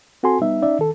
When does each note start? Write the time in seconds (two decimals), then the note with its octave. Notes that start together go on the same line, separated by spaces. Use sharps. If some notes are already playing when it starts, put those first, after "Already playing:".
0.23 C4 F#4 A4 G#5 C6
0.42 G3 B3 D#4 E5
0.62 C#4 D#4 D5 E5
0.79 D#3 A4